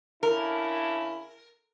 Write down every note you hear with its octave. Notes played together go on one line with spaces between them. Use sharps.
C#3 D4 E4 A#4